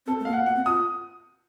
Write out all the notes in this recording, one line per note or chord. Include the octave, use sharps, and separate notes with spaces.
C4 A4
A3
A#3 F5
F#5
A#3 F#5
C4
F4 D#6